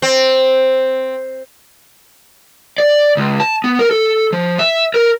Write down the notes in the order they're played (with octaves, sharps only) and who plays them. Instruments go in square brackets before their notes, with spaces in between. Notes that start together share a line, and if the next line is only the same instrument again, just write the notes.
[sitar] C4
[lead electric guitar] D5
C#2
A5
B3
A#4
A4
F3
E5
A#4